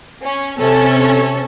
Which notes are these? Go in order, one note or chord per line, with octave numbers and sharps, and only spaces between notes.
C#4
C3 C#4 A4